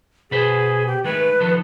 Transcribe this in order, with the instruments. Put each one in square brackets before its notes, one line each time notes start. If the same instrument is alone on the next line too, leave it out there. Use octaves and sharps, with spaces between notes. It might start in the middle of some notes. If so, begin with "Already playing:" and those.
[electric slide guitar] B2 B4 C5 [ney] G#4
[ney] G4
[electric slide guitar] D#3 G#3 A3 [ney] B4
[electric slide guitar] D#3 F3 A4